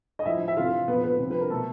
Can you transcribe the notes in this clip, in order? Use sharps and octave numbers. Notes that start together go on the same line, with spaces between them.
D#5
A2 F3 E4 E5
E5
C3 E3 F4 F5
A#2 F3 B3 B4
B3 B4
C3 F3
B4
A#4
B2 A3 A4